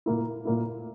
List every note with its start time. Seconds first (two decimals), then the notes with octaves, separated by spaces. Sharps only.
0.06 A#2 A#3 E4
0.45 A#2 A#3 E4